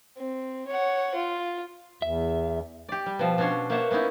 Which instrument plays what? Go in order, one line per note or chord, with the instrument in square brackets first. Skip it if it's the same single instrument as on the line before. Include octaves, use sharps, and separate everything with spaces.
[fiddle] C4
C#5 F#5
F4
[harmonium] E2 [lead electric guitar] E5
[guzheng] G4 D5
G3
B2 F3
B2 C#4 D4 C#5 C6
A#3 C5 C#5 E5 F#5 A5
A#3 B3 C#4 D#4 E4